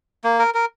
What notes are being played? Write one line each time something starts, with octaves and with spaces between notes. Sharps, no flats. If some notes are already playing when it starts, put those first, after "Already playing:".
A#3
A#4
A#4